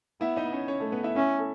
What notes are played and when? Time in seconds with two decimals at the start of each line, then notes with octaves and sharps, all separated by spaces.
0.21 B3 E4 E5
0.37 D#4 D#5
0.52 C#4 C#5
0.68 C#4 C#5
0.80 A3 A4
0.92 B3 B4
1.04 E4 E5
1.15 C#4 E4 E5
1.39 A4